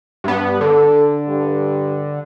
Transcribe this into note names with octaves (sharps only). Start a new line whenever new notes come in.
G2 B3
D3 A4
G2